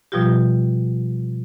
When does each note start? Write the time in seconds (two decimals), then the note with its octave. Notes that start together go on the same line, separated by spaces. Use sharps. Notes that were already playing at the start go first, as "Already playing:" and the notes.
0.12 B2 F3 G3 F4 G4